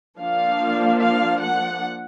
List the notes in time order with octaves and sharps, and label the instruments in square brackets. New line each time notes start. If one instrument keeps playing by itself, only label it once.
[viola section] F3 A#3 D4 F5
F5
F#5